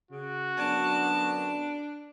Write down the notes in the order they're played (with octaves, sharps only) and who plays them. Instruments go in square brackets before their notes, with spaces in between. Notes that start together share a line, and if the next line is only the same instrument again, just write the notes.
[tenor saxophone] C#3 [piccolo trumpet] F#4
[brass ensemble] F#2 D3 B3 [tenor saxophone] D4 [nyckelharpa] A5